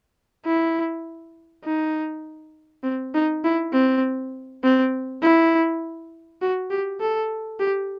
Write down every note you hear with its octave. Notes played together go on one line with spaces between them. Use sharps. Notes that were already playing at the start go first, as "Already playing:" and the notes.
E4
D#4
C4
D#4
E4
C4
C4
E4
F#4
G4
A4
G4